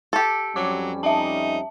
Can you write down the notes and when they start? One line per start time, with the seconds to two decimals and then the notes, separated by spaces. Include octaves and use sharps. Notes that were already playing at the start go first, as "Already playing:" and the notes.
0.13 G4 A4
0.56 F2 F#3 G3 C#4 D6
1.03 D#4 E5 A5